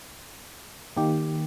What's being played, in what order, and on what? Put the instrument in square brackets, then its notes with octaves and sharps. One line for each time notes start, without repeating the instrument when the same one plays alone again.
[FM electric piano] D#3 A#3 G4